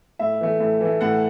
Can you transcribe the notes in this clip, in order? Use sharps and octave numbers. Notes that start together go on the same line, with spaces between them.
A2 E5
E3 A3
A2
E3 A3
A2 F#5